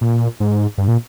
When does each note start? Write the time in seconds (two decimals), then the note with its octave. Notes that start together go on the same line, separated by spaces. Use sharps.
0.01 A#2
0.40 G#2
0.78 G2
0.88 A#2